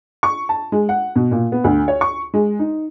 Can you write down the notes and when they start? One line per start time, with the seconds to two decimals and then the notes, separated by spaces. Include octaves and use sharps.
0.23 C#6
0.49 A5
0.72 G#3
0.89 F#5
1.16 B2
1.31 A#2
1.52 B3
1.64 D2
1.88 C#5
2.01 C#6
2.34 G#3
2.59 D#4